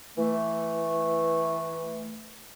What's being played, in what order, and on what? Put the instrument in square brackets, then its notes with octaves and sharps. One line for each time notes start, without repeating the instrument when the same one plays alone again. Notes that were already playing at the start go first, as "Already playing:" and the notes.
[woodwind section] E3 A3